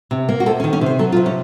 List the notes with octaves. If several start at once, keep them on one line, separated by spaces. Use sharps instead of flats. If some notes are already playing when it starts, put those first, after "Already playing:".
C3
A#3
F#4
C3 A4
C#4
D#3
C#4
C3 C5
F#3 A4
F4
C3
C#4